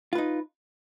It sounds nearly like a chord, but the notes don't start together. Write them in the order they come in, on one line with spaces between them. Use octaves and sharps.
F4 B4 D#4